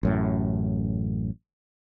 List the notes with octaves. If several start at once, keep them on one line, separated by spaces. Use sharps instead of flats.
A1 F#2 A2